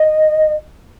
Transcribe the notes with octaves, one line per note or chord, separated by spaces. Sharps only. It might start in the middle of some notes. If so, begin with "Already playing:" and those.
Already playing: D#5